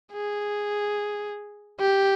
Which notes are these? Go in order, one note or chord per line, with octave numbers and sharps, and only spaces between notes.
G#4
G4